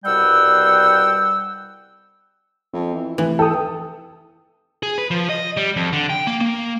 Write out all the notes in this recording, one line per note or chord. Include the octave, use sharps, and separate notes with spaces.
C2 B2 G3 F#5 G5 E6
F2 C4
E3
F1 E3
A4 G5 D#6
G#4
B4
F3
D#5
G3
F2
D3
G5
A#3
A#3